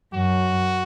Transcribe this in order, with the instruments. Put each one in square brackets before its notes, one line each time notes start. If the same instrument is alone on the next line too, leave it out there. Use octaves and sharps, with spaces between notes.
[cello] F#2 [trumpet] F#4